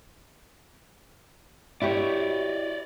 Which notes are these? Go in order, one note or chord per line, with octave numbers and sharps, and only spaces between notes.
E4 F#4 G4 C#5 D5